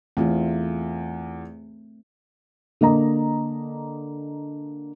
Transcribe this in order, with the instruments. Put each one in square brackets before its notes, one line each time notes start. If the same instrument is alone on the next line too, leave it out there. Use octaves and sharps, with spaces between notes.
[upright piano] E2 F4 [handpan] A3 C4
[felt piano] D3 A#3 D#5 A#5